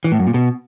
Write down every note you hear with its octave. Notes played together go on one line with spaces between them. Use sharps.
E3
A2
F#2
A#2
B2